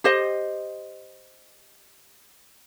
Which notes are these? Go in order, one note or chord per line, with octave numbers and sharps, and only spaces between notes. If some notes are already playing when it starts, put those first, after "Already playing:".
G4 C5 D#5